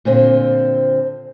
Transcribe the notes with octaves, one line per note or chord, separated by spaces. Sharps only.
A#2 D3 C4